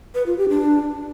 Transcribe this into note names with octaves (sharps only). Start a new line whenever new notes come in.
B4
F4
G4
D4